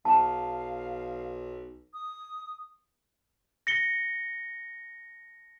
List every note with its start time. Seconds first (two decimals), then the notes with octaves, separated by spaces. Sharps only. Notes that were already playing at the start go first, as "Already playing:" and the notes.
0.05 B1 F5 A5
1.94 D#6
3.67 A#6 C#7 G7